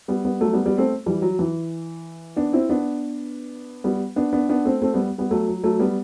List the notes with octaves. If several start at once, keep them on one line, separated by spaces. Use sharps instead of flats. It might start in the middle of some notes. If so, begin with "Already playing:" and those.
G3 B3
G3 B3
F#3 A3
G3 B3
G3 B3
A3 C4
E3 G3
F#3
E3
B3 D4
C4 E4
B3 D4
G3 B3
B3 D4
B3 D4
B3 D4
A3 C4
A3 C4
G3 B3
G3 B3
F#3 A3
F#3
F#3 A3
G3 B3